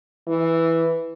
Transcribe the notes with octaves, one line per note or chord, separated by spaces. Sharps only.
E3